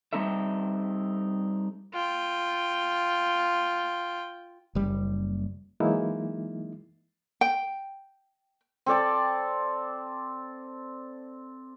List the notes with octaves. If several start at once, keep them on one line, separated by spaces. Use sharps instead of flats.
G3 C4 D#4 A4 E5
F4 G5
F#1 G3
E3 F#3 G#3 A#3 D#4 E4
G5
C4 A4 D5 A5